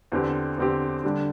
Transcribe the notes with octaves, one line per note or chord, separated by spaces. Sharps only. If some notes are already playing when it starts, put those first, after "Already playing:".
E2 D3 C4 G4
E2 D3 C4 G4
D3 G3 D4